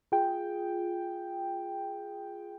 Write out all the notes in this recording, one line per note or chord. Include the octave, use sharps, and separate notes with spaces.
F4 G#4 G5